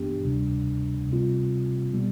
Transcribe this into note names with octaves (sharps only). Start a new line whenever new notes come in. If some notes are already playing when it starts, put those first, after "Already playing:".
Already playing: G2 E3 B3 D4 G4
D2 C3 G3 D4
C3 G3 C4 F4
B2 G3 B3